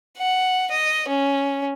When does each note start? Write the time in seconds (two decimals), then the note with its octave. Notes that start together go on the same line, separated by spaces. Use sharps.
0.17 F#5
0.70 D#5
1.08 C#4